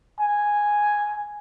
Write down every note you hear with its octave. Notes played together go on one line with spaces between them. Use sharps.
G#5